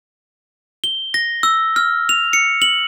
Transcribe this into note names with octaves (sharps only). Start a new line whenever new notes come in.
G7
A#6
E6
F6
F7
C#7
F#7